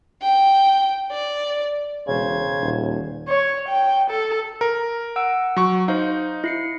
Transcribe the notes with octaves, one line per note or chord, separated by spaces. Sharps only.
G5
D5
E1 C#3 C5 G#6
D#1
C#5
G5
A4
A#4
F#5 E6 D7
F#3 C#6
D#4 C5 F5
E4 C7 C#7